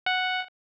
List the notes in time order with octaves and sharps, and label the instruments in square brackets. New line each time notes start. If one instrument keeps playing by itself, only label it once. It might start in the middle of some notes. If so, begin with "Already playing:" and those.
[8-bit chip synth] F#5